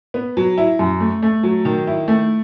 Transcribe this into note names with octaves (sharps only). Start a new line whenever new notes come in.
B3
F#3
E4
F#2
A3
A3
F#3
D#3
E4
A3